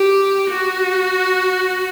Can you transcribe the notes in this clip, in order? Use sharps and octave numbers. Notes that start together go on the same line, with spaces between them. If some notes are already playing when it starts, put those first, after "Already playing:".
Already playing: G4
F#4